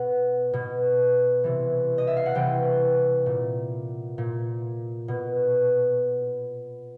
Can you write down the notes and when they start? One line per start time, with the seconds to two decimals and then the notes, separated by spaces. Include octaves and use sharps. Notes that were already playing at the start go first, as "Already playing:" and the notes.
Already playing: B2 F#5
0.53 B2
1.44 C3 E3
1.98 D#5
2.07 E5
2.16 F5
2.26 F#5
2.35 C3 E3 G5
3.26 A#2
4.18 A#2
5.08 B2